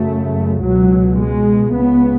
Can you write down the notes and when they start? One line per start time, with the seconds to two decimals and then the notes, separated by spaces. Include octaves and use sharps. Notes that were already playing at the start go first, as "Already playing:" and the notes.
Already playing: F#2 C#3 A3
0.62 C#2 B2 F#3
1.18 G#3
1.74 C#2 C#3 B3